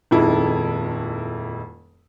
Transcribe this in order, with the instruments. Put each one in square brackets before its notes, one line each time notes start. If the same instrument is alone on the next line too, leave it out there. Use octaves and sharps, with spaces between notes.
[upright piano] D#1 F2 D#3 G#3 E4